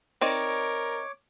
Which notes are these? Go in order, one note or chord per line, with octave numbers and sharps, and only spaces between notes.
C4 D#4 A#4 C#5 D5 D6